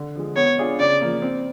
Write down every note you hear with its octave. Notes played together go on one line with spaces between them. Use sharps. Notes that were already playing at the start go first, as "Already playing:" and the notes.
Already playing: D3
F3 G#3
B3 C#5
D4 F4 G#4
C#3 D5
F3 A#3
C4